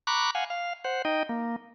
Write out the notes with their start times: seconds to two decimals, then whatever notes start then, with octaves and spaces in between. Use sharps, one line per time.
0.07 A#5 B5 C#6 D6 F#6
0.35 F5 F#5 G#5
0.50 F5
0.84 C5 F#5
1.05 D#4 D#5 G5
1.29 A#3